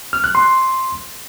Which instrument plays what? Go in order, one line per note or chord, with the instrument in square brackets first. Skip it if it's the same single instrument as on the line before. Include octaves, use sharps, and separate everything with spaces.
[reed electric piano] F6
F#6
C6